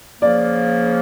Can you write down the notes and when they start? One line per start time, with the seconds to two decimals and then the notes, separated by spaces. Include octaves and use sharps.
0.22 C#3 F3 A#3 D5